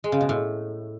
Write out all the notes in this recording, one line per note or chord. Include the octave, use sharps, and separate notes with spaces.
G#3
C#3
B2
A2